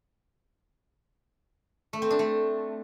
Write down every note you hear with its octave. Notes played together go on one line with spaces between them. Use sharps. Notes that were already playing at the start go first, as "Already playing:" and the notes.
A3
C4
D4
A3